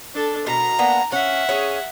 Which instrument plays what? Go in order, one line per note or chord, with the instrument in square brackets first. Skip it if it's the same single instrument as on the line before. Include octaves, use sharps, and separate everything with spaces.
[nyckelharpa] D4 A4
[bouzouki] B2 A#4 [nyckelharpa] A#5
[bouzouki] A#3 B3 D4
[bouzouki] C#4 [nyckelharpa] E5 F#5
[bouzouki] C#4 G#4 C#5